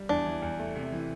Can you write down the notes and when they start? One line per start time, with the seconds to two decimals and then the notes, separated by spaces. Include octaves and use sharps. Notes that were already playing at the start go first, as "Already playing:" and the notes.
Already playing: G3
0.09 E2 D4
0.26 E3
0.42 E2
0.59 A3
0.75 C3
0.92 E3